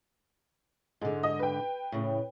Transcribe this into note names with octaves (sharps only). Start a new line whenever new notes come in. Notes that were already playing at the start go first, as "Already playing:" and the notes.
G#2 D3 G#3
D#5
B4 G5
A2 C#3